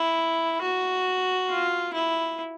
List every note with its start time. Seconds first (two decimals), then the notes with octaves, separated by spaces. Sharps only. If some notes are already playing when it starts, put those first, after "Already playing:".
Already playing: E4
0.62 F#4
1.49 F4
1.94 E4